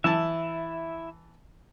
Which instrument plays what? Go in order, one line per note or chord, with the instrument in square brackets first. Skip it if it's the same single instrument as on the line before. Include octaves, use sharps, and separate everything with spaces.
[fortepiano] E3 A5 [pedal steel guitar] E4 E5